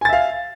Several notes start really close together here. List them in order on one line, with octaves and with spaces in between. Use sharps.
G#5 A6 E5 F5